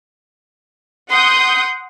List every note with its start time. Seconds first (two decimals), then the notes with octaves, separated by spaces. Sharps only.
1.10 F#5 C6 D#6 G6